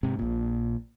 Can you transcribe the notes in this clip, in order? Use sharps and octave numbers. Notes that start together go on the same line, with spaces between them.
G#2 C3
A#1 A#2